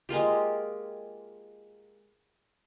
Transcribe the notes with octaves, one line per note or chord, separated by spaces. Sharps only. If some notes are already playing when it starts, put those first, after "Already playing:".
G#3 A#3 F4 G4